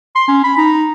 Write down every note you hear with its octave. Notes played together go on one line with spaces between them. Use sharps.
C6
C#4
B5
D#4